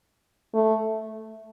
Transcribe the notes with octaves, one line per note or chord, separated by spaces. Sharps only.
A3